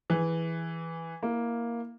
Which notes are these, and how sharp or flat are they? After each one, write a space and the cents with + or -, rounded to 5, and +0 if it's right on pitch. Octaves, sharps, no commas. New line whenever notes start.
E3 +0 G#4 +0
A#3 +5 E4 +0